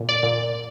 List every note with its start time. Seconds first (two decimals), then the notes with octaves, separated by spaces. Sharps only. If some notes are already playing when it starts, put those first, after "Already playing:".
Already playing: A#2
0.09 D5
0.23 A#2